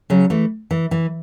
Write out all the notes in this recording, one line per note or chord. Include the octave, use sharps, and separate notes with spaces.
C#3 F#3
E3 A3
E3
E3